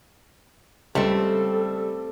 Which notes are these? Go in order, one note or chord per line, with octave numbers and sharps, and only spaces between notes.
C#2 G3 A3 C4 A4